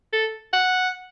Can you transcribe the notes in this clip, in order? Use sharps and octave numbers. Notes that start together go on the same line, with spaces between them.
A4
F#5